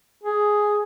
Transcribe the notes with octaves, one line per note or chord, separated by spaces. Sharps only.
G#4